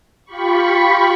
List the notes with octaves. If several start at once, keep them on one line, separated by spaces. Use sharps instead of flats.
F4 G4 B5 C#6